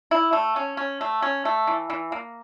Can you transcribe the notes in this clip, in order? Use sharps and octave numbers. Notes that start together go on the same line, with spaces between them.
E4
A3
C#4
C#4
A3
C#4
A3
E3
E3
A#3